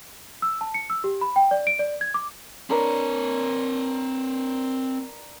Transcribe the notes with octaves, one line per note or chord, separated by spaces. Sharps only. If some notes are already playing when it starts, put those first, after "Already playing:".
E6
A5
C#7
E6
G4
B5
G5
D5
D7
D5
G#6
D6
C4 D4 A#4 B4 C#5